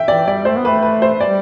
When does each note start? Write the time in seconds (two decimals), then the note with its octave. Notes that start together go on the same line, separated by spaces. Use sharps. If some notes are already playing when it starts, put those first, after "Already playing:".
Already playing: E5 G5
0.08 E3 D5
0.27 G3 D5
0.45 A3 C5
0.57 B3
0.65 A3 B4
0.83 B4
1.02 C5
1.20 G3 D5